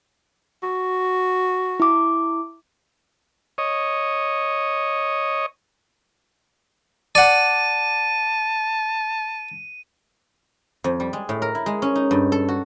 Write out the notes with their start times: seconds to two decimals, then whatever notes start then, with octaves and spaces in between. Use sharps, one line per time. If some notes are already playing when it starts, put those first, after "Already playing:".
0.63 F#4
1.80 E4 D6
3.58 C#5 D#5
7.15 D5 F#5 A5 D#7
10.84 F2
11.00 G3
11.13 G#3
11.29 A2
11.42 A#4
11.55 E4
11.66 G#3
11.82 C#4
11.95 D#4
12.11 G2
12.32 A4
12.48 F#4